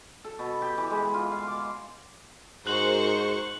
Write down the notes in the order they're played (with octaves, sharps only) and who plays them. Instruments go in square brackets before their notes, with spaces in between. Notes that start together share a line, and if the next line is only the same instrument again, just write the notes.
[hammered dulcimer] A4
B2
G4
E3
G#3
F4
F5
D6
[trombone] G#2 [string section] F#4 G#4 A#4 [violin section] C5 C#6 [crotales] F#6 F#7